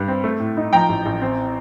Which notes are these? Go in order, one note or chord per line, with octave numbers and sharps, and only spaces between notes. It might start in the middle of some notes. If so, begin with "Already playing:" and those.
Already playing: G2 G3
C4
A3
A2
D#4
F3 G5 A#5
A1
A1
C4